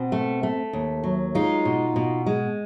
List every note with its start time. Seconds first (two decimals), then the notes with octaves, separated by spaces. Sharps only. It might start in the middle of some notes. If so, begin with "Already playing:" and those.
Already playing: B2 C4
0.12 A3
0.43 A3
0.73 D#2
1.04 F#3
1.35 G#3 D#4 F4
1.65 B2
1.96 B2
2.26 G#3